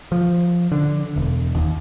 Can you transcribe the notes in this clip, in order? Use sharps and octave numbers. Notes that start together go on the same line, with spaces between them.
F3
D3
E1
D#2